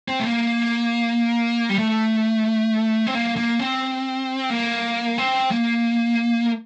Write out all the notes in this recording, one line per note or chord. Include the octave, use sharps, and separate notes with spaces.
C4
A3
A#3
G3
A3
C4
A#3
A#3
C4
A#3
C4
A#3